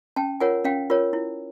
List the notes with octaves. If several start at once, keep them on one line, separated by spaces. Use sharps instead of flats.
C#4 G5 A5
F4 A#4 C#5 F#5 G#5
C#4 F5 G5
F4 A#4 C#5
E4